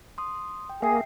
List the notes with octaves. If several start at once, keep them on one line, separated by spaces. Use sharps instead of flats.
C6 D#6
G5
A#3 G#4 E5 G5 C7